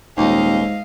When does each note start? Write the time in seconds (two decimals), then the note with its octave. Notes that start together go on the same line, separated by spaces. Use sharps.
0.17 D#1 D#2 G#2 D#5 F5